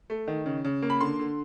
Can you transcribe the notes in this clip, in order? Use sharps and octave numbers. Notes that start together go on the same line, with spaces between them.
A3
D#3
C#3
C#3
A#3
B5
D3 C6
D3